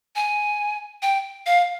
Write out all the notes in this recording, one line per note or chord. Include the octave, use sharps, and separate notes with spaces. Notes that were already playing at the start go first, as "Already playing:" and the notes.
G#5
G5
F5